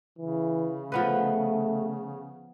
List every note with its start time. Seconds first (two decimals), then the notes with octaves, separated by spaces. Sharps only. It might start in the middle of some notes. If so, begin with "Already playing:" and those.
0.18 C#3 E3
0.92 F3 A3 B3 B4